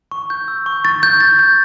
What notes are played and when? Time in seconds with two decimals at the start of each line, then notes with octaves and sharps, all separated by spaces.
0.11 C#6
0.30 G6
0.48 E6
0.66 C#6
0.84 C#6 A6
1.03 C#6 G6
1.21 G6 A6
1.39 G6